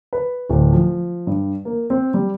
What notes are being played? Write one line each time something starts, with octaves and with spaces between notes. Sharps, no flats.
B4
D1
F3
G2
A#3
C4
G3